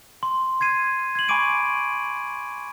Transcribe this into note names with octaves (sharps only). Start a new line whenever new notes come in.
C6
C6 G#6 C7 D#7
G#6 C7 F#7
G#5 B5 C#6 D6 D7 D#7